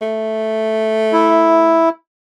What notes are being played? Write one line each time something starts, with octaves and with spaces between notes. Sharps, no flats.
A3
E4